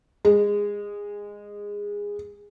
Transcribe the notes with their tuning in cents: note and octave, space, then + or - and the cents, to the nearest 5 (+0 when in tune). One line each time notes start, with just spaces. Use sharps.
G#3 -15